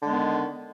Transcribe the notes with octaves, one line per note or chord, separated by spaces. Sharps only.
D3 D#3 G#3 B3